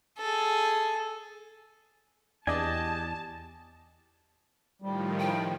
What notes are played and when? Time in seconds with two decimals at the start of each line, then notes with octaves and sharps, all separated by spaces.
0.19 G#4 A4
2.47 E2 D4 G4 D5 D#5 G#5 A5
4.82 A2 D#3 F3 G3
5.20 G5